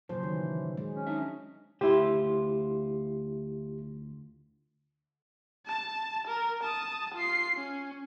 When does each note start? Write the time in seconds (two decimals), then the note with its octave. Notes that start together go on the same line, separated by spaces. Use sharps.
0.09 A#2 C#3 F3 F#3 C5
0.23 D#3 E3
0.77 G#3
0.95 C#4
1.07 D4 D#4 E5
1.81 D2 E4 F4 G4 C5
5.66 A5
6.27 A#4
6.63 A5 D#6
7.14 F4 C7
7.56 C#4